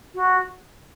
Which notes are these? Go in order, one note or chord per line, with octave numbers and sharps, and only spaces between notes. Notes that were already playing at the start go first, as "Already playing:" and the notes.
F#4